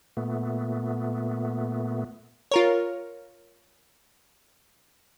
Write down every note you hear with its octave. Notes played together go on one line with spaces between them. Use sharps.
A#2 A3 B3
F4 A#4 C#5